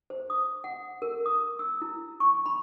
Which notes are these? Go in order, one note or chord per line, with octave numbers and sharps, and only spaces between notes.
C5
D#6
F#5
A#4
D#6
E6
E4
C#6
B5